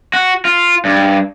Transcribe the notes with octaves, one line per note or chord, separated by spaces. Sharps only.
F#4
F4
G2